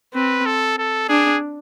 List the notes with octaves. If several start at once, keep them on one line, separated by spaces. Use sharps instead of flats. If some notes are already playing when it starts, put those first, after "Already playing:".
C4 B4
A4
A4
D4 G#4